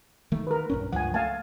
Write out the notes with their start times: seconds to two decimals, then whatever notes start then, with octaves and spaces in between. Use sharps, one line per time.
0.32 D#3 A3
0.47 A#4 B4
0.70 B1 G2 C#4
0.92 C#2 G2 F3 F#5 G#5
1.14 A3 F5 G#5 A5